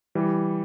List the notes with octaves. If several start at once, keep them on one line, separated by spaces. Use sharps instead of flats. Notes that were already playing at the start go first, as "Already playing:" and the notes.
E3 G3